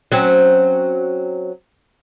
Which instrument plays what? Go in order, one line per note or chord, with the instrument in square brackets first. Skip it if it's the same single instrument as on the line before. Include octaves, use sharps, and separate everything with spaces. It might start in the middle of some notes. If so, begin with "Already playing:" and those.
[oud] F#3 C4 C#4